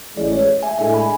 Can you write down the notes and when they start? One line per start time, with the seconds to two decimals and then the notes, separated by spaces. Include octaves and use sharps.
0.17 A1 A2 E3 G#3 D5
0.32 C#5
0.63 E5 G#5
0.78 A2 G#3 D4 A4 E5 G#5
0.94 G#5 B5